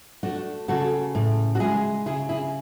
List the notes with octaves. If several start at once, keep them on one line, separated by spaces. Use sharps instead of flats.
A3 D4 F#4
C#3 F#4 A4
A2
F#4
G#3 E4 G#4
C#3 E4 G#4
E4 G#4